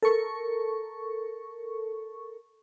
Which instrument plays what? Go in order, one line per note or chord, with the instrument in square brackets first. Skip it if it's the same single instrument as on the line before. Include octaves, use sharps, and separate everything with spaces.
[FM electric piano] A4 A#4 C#6